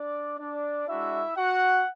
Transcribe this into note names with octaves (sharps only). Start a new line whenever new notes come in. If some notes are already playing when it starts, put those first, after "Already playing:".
Already playing: D4 D5
D4 D5
G#3 D4 E4 F#4 E5
F#4 F#5